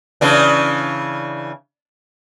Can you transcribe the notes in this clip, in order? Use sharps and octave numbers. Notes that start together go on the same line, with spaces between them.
C#3 E3 D4